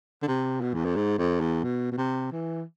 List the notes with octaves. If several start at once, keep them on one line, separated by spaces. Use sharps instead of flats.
D3
C3
B2
E2
F2
G#2
F2
E2
B2
B2
C3
E3